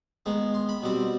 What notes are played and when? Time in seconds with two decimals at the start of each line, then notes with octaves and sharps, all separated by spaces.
0.26 D#3 G#3 B3
0.54 C6
0.69 B5
0.82 B2 G3 C4